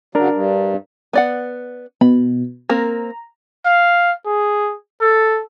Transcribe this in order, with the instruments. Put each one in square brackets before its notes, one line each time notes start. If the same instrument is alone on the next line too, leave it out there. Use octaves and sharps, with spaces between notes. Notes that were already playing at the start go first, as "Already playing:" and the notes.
[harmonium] C#3 F#3 [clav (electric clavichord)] D4 A#4
[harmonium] G2
[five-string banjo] B3 D5 F#5
[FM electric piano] B2 [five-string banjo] B5
[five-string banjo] A#3 C4 A#4 [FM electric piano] A#5
[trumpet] F5
G#4
A4